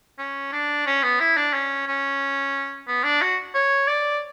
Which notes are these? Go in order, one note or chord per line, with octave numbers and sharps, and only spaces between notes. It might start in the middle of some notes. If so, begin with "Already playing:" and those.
C#4
D4
C#4
B3
E4
D4
C#4
C#4
B3
D4
F#4
C#5
D5